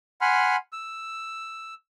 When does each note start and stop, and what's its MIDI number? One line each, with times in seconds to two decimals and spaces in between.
0.21 0.56 78
0.21 0.56 80
0.21 0.56 83
0.21 0.56 84
0.21 0.56 89
0.73 1.74 88